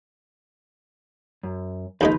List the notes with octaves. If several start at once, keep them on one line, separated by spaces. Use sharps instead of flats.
F#2
D#2 C#3 F3 G#3 D#4 B4